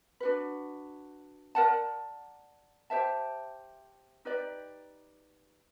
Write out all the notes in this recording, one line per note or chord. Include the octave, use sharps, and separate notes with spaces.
D4 F#4 B4
A#4 D5 F#5 A5
G4 C5 E5 A5
D#4 G4 B4 D5